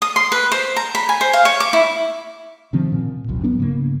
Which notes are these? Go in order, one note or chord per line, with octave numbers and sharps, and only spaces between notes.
D#6
C6
B4
C5
A#5
B5
G#5
C5
F5
C#5
D6
E4
C3 D#3 F3 C4
A#2
F#1 C2 F#2
F#3 B3 D4
G#2 C#3 A#3